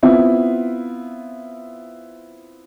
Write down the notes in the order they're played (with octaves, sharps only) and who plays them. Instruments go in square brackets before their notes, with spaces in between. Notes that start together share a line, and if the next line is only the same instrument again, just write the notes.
[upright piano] B3 C4 E4 F4